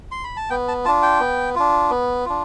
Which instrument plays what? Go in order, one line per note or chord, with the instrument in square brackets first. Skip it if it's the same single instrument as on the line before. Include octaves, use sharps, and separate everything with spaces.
[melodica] C6
B5
A5
B3 G5
A5
F4 A5
D4
G5
B3
D4 F4
B3
D4 F4